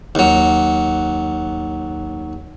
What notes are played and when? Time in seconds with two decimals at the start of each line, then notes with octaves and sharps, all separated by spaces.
0.15 D#2 F#3